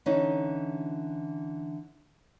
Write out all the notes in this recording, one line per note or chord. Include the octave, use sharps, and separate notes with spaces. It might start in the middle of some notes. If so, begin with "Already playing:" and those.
D3 E3 C#4 D#4